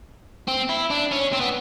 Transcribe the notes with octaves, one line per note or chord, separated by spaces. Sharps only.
C4
E4
D4
C#4
C4
B3